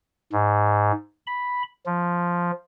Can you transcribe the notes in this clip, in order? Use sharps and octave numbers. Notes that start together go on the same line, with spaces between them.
G#2
B5
F3